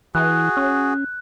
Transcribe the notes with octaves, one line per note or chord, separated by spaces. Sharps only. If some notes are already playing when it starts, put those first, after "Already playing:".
E3 F#4 G#4 F#6
C#4